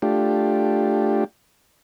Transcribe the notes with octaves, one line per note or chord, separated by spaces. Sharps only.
A3 D4 F4 G4